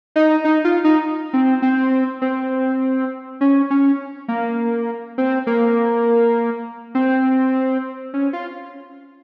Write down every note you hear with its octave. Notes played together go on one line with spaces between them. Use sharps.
D#4
D#4
F4
D#4
C4
C4
C4
C#4
C#4
A#3
C4
A#3
C4
C#4
F4